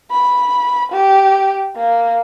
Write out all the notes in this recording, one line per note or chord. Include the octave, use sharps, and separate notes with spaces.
B5
G4
A#3